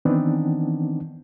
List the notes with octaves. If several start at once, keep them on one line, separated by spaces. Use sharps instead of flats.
D#3 E3 B3 C4 D4 D#4